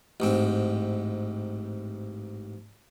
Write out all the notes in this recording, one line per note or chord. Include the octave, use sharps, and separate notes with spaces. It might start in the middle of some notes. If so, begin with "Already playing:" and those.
A1 G#2 C4